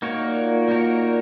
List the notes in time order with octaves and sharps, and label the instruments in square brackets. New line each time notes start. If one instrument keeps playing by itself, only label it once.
[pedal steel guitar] A#3 D#4 F#4 A#4 C#5
[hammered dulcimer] A#2
A#2
A#2
[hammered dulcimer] A#2 [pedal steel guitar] A#3 D#4 F#4 A#4 C#5
[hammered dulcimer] A#2
B2